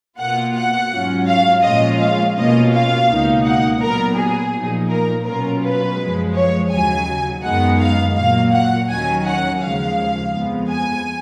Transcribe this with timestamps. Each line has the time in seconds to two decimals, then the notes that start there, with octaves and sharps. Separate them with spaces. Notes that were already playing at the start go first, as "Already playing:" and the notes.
0.18 B2 A#3 F4 F#5
0.54 F#5
0.90 G#2 F#3 C#4 F4
1.27 F5
1.62 A#2 F3 G#3 C#4 F4 D#5
1.99 F5
2.36 B2 A#3 C#4 F4 D#5
2.72 F5
3.08 C#2 B2 A#3 D#4
3.44 F#5
3.80 A#2 F#3 B3 A#4
4.16 G#4
4.53 A#2 F3 A#3 D#4
4.89 A#4
5.25 B2 F#3 C#4 F4 A#4
5.62 B4
5.98 F#2 F3 G#3
6.35 C#5
6.70 D#2 C#3 F#3 G#5
7.43 F#2 D#3 G#3 B3 D#4 F#5
7.79 F5
8.16 A#2 F#3 A#3 F5
8.52 F#5
8.88 D#2 D#3 F#3 C#4 G#5
9.24 F#5
9.60 D#2 C#3 F3 G#3 F5
10.33 F2 F3 G#3 B3
10.70 G#5